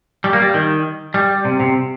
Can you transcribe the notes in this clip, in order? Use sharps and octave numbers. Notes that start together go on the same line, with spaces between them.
G3
A#3
G3
D#3
G3
C3
C3